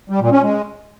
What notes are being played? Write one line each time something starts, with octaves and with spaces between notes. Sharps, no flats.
G3
A#2
C#4
G#3